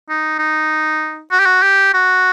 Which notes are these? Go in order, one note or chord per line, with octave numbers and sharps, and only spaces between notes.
D#4
D#4
F#4
G4
F#4
G4
F#4